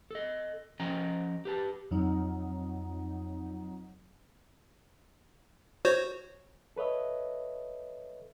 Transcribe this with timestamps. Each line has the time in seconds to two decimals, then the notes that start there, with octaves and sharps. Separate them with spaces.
0.11 A4 D#5
0.80 F3 C#4 D#5 G5 G#5 A#5
1.45 G4 B4 A5
1.91 F2 F#3 D#4
5.85 F#4 C5 C#5
6.76 A4 B4 C#5 D#5 E5